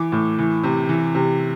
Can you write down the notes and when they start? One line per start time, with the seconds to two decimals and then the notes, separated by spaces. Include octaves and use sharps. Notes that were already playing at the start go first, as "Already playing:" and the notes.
Already playing: E3 D6
0.12 A2
0.38 E3
0.63 C3
0.89 E3
1.15 C3